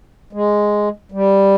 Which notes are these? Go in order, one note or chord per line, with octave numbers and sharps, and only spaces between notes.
G#3
G3